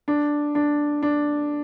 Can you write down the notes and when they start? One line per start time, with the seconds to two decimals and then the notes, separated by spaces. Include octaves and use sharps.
0.08 D4
0.55 D4
1.02 D4